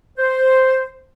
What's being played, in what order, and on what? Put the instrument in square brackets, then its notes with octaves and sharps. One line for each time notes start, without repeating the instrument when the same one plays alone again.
[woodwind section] C5